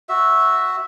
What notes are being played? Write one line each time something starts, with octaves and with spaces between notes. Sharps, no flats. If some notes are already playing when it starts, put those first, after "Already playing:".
F#4 E5